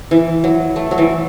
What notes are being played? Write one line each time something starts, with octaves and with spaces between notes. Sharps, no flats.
E3
F#3
A3
F#3
E3